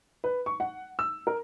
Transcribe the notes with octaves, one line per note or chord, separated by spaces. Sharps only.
B4
C#6
F#5
E6
A#4